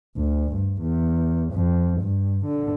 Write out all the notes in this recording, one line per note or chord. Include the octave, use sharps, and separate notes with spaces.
D2
G2
E2
F2
G2
D3